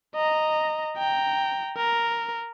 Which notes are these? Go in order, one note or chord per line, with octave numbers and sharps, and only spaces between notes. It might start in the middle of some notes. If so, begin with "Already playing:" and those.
D#5 A#5
G5 A#5
A#4